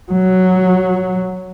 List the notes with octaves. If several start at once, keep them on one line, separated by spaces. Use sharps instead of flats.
F#3